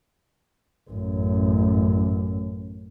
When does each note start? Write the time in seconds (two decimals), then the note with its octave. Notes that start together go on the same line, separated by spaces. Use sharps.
0.90 A1 F#2